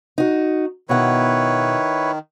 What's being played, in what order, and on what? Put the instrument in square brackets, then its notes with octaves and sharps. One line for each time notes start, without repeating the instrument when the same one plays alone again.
[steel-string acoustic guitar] D#4 F#4
[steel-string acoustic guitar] B2 F#5 [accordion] D#3 [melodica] E4 B4 C#5